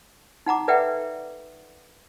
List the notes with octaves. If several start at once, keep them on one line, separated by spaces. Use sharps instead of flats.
D#4 F#5 A#5 D6
A4 B4 D5 E5 F#5 G5